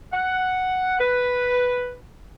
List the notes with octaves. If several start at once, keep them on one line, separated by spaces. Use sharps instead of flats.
F#5
B4